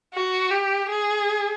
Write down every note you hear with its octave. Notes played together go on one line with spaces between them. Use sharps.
F#4
G4
G#4